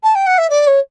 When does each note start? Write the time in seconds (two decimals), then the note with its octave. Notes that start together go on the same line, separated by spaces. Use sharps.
0.03 A5
0.15 G5
0.26 F#5
0.38 E5
0.50 D5
0.67 C#5